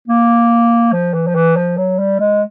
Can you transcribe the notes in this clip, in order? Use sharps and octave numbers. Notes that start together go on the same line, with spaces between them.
A#3
F3
E3
F3
E3
F3
F#3
G3
G#3